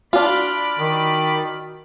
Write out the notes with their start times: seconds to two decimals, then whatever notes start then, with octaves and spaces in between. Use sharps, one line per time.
0.13 D4 F4 F#4 D5 B5 F6
0.79 D#3